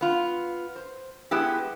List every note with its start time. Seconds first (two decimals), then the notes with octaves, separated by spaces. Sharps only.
0.01 B3 F4
0.76 C5
1.31 G#3 B3 E4 G4